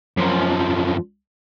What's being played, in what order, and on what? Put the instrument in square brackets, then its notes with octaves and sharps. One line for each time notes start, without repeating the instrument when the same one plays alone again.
[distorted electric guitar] F#2 F3